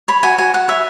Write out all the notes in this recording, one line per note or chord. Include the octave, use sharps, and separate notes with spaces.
C#5 B5
F#4 G#5
F#4 G#5
F#4 F#5
C#5 E5